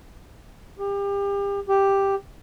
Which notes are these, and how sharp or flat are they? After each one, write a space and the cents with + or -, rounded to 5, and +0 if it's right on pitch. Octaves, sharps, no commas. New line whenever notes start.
G4 +35
G4 +5